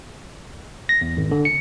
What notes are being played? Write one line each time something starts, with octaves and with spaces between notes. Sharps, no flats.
A#6
E2
G#1
D3
C#7